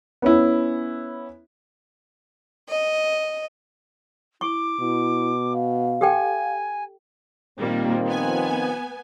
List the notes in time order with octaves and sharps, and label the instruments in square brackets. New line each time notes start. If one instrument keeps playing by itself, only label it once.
[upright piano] B3 C#4 E4
[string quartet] D#5
[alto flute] E4 [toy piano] C#6 [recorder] D6
[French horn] B2 [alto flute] E4
[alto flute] F5
[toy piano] G4 A4 G5 [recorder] G#5
[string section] A#2 G3 A#3 [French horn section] D#3 F3 C4
[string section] B3 G#5